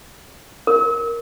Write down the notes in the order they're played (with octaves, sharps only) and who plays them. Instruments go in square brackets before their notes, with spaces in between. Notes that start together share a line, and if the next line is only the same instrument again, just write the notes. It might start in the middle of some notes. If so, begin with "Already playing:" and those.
[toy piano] A#4